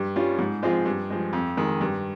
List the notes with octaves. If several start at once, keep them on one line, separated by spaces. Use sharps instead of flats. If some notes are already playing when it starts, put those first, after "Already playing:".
Already playing: G2
G3 C#4 F4
G#2
F3 G#3 C4 F4
G2
F3 G#3
F2
D#3 G#3
G2